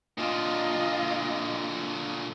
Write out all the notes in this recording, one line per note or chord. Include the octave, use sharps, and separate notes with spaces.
A#2 D3 F4 D#5